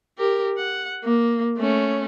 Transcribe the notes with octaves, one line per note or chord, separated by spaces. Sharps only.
G4 A#4
F#5
A#3
A3 C#4